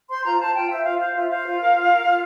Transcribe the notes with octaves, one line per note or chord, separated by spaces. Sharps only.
C5 C6
F4 A#5
C5 A5
F4 G5
C5 E5
F4 F5
C5 F5
F4 E5
C5 F5
F4
A#4
F4
A#4
F4